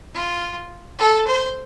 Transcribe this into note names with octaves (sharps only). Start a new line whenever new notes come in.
F4
A4
C5